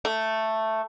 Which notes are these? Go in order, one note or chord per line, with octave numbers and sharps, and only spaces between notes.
A3